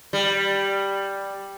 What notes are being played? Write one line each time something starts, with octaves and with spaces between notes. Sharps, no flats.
G3